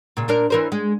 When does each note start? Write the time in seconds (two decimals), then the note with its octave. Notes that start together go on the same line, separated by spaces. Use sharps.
0.17 A#2 C#3
0.28 A#2 D4 A#4
0.50 E3 A#4 C5
0.72 G#3